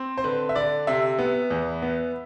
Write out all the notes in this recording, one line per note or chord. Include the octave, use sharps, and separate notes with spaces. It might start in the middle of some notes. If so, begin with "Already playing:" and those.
Already playing: C4
C5
D3 B4
E5
D3 D5
C3 E5
B3
E2
B3